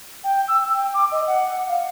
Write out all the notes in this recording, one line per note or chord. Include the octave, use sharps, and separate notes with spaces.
G5
E6
G5
D6
D#5
F#5
F5